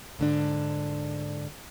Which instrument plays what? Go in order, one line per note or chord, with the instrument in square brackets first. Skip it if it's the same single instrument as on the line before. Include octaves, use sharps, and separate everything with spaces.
[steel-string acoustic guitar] G#2 D3 D4